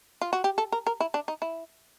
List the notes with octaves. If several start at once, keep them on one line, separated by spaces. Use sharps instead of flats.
F4
F#4
G4
A4
A#4
A#4
E4
D4
D#4
E4